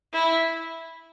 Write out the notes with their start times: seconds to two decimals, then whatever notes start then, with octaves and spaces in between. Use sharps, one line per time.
0.14 E4